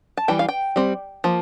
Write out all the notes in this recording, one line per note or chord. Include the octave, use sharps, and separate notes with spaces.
A5
E3 G3 G5
F5
G5
G3 C4
F3 A#3